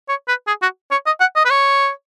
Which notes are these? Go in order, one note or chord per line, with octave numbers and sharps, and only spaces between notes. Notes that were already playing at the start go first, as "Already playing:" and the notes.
C#5
B4
G#4
F#4
C#5
D#5
F#5
D#5
B4
C#5